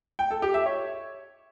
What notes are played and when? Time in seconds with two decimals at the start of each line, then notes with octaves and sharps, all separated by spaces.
0.19 G5
0.31 A4
0.42 G4
0.54 E5
0.66 C#5